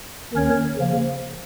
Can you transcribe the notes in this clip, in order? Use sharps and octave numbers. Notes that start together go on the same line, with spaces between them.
D#2 D#3 C#4 A#4 C#5
C#3 F3 A#3